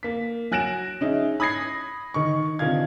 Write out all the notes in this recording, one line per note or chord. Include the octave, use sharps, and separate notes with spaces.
A#3 B6
F#3 G#5 F#6 A#6 D7 E7
C#4 D#4 G#4 E5
B5 D#6 G#6 A#6 C7
D#3 D#4 C#6
C3 D#3 D4 F4 F5 G#6